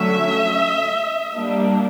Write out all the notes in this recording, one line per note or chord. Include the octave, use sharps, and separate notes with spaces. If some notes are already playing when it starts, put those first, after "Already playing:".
Already playing: D3 F#3 A3 C#4 E5
G3 A#3 D4